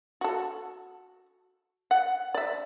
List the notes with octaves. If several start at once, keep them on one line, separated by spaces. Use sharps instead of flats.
F#4 A4
F#5
D5 E5